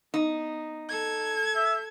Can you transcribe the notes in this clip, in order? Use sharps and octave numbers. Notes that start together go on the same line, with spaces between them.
B3 D#4
A4 G#6
E5